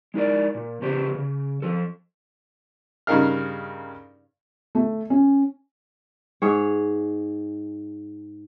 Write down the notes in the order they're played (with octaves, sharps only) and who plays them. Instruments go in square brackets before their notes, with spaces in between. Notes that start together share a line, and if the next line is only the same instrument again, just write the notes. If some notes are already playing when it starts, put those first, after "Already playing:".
[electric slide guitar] G#3 D#4 A#4 D5
A#2
C#3 G4 B4 C5
C#3
F3 A4
[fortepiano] G2 C#3 D#4 A#4 F5 F6
[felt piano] A3
C#4
[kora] G#2 G#4 C#5